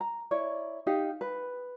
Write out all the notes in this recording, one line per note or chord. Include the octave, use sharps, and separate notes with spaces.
A#5
E4 C#5 D5
D#4 G4 D#5 F5
B4